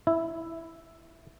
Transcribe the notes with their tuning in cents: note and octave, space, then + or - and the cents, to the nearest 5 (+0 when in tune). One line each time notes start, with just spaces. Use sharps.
E4 +0